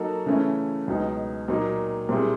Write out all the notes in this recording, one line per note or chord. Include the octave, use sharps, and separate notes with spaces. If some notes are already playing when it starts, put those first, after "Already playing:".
Already playing: F#3 A#3 D#4 F#4 A4
C#3 E3 A3 C#4 E4
C#2 B2 F#3 B3 D#4
A#2 F#3 A#3 D#4
A#2 G3 C4 E4 G#4